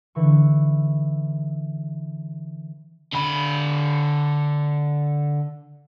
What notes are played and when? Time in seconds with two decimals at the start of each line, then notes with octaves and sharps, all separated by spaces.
0.15 D3 E3 C#6
3.13 D3 B5